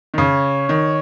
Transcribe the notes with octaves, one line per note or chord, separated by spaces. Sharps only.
D#3
C#3 C#5
D#3